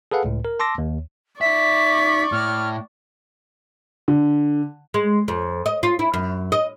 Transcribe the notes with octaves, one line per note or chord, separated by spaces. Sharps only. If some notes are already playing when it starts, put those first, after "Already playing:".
G#4 A4 B4 F5 F#5
C#2 A2
A#4
A5 C6 D6 E6 A#6
D#2
D#4 D5 E5 C#6 B6
A2 F6
D3
G#3
F2
D#5
F4
E4
F#2
D#5